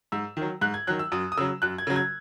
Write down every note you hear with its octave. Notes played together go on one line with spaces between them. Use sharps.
G#2 E6
D#3 F#3
G#2 F#6
G#6
D#3 F#3 F#6
E6
F#2 D#6
D#6
C#3 F#3 E6
F#2 F#6
G#6
C#3 F#3
G#6